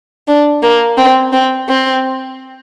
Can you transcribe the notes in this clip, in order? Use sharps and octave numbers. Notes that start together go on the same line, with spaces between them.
D4
A#3
C4
C4
C4